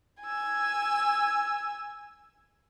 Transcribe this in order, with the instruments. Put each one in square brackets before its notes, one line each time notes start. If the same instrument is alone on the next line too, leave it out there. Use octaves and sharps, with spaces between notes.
[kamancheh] G#5 E6